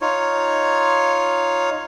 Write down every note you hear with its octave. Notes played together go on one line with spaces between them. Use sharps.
D#4 F4 C#5